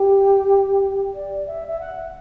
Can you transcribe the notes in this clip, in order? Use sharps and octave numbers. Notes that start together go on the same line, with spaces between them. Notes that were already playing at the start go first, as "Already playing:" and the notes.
Already playing: G4
D5
E5
E5
F#5